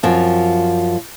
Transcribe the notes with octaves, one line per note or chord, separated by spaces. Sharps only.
F#2 F3 C4